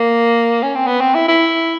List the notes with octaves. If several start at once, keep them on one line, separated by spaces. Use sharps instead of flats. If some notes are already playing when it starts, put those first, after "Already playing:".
Already playing: A#3
C#4
C4
B3
C4
E4
E4